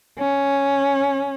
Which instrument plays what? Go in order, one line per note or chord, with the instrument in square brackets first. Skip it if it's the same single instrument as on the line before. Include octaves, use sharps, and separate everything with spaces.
[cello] C#4